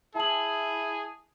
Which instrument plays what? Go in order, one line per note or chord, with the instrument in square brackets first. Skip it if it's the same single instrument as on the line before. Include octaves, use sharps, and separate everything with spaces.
[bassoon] E4 [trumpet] G#4 [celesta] A5 F#7